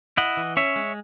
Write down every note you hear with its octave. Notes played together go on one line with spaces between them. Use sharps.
E4 D#5 F#5
E3
C#4 C#5 E5
G#3